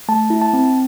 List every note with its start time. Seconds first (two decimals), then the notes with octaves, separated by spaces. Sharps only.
0.08 A3 A5
0.30 E4
0.42 A5
0.53 C4